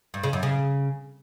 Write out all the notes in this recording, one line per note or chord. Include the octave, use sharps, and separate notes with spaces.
G2
C#3
F#2
C#3